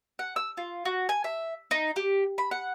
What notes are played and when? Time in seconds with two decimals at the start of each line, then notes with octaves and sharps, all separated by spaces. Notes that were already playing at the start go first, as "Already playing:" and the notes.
0.19 F#5
0.36 E6
0.57 F4
0.85 F#4
1.09 G#5
1.24 E5
1.71 D#4
1.96 G4
2.38 B5
2.51 F#5